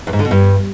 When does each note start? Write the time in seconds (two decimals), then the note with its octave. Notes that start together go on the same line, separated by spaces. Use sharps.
0.07 E2
0.13 G#2
0.19 D3
0.25 B2
0.31 G2